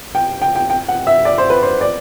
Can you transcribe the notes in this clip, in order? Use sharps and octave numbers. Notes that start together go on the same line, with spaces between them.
G5
G5
G5
G5
F#5
E5
D5
C5
B4
C5
D5